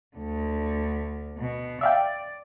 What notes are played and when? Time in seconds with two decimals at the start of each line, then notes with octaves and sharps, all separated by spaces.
0.17 D2 D3
1.38 B2
1.81 D5 E5 F5 G5